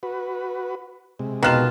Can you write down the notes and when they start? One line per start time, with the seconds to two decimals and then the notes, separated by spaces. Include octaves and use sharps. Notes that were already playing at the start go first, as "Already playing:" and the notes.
0.03 F#4 B4
1.19 C3 G#3
1.43 B2 D#3 F4 F#6 E7